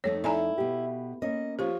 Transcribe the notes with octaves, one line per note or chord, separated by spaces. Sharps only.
F2 A3 D#4 C#5
E4 D5 G#5 A#5
B2 G4
A#3 C#4 D#5
F3 G4 C#5